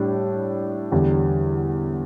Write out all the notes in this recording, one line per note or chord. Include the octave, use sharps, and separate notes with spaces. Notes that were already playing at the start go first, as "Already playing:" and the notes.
Already playing: A2 G3 D4
E2 D3 G3